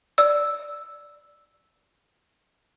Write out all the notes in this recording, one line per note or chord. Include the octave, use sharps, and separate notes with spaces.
D5 E6